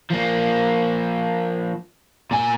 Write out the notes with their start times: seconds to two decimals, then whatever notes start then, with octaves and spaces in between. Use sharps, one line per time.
0.11 F3 A#3
2.31 A#2 G#5